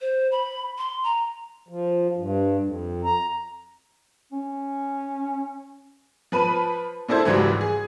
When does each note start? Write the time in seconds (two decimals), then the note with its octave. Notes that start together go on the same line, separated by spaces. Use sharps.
0.01 C5
0.32 B5
0.78 C6
1.04 A#5
1.69 F3
2.17 G2
2.61 F2
3.05 A#5
4.32 C#4
6.32 F3 B4 B5 D#7
7.08 A#2 D4 E4 A4 C5 G#6
7.25 G#1 C#2 G#2 E3 F#3 G3
7.61 G#4